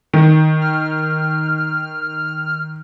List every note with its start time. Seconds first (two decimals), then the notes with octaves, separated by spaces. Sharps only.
0.14 D#3
0.62 F6